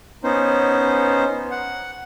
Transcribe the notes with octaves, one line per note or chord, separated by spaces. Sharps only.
B3 C#4 D#4 C5
F#5